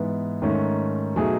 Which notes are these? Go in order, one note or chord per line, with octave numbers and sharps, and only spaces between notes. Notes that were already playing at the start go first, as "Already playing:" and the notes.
Already playing: G#2 E3 B3
G#2 D#3 A3 C#4
B2 F#3 A3 D#4 G#4